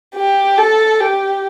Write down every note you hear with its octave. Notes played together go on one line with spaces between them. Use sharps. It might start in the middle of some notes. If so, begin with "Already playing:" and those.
G4
A4
G4